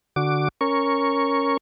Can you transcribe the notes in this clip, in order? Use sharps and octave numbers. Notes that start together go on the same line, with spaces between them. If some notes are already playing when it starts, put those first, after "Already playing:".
D3 F#4 D6
C#4 A#4 C#6